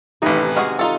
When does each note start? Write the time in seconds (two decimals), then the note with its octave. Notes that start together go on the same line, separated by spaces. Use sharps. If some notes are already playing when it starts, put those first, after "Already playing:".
0.22 A1 C3 D#3 D#4 B4 E5
0.56 G#3 F#4 G#4 F6
0.79 D#4 F4 A4 F#5